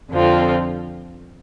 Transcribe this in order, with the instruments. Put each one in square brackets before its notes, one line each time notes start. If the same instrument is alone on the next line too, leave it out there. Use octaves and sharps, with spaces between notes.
[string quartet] F2 D3 F3 C4 F4